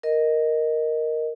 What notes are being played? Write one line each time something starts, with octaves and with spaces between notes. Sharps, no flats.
A#4 D#5